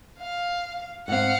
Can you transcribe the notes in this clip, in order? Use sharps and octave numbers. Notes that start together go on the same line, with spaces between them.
F5
G#2 C4 F5 F#5